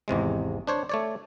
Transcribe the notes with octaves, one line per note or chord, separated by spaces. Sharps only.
G#1 E2 C3 G#3
D4 C5 C#5
A3 C#5 D5